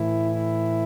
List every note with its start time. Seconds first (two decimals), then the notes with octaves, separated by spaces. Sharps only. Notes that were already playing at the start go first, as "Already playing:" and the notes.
Already playing: A2 E3 E4
0.32 E4